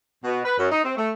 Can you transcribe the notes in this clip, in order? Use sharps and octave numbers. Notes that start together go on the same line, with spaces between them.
B2
B4
F#2
D#4
C4
A3